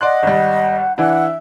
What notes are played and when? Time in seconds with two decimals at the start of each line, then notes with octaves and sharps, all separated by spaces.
0.01 D5 D#5 F#5 C6 F#6
0.23 G#1 G3
0.98 E3 D4 E4 E5 F#5